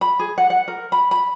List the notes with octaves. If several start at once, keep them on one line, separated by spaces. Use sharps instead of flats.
B5
G#4
F#5
F#5
A#4
B5
B5